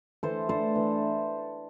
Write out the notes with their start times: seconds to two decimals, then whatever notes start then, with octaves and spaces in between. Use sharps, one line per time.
0.23 E3 A4 C5
0.49 A3 D4 A4 C5
0.75 E3